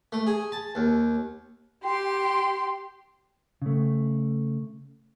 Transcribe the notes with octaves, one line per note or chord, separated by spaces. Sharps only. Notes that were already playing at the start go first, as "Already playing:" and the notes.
A3
G#4
A5
D#2
G4 G5 C6
C#3 A3